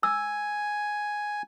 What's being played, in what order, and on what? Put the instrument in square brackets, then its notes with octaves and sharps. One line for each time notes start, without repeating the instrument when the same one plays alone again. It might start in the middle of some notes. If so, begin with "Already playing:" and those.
[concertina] G#5 [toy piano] E6